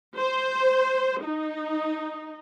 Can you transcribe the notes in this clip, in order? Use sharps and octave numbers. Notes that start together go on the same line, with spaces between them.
C5
D#4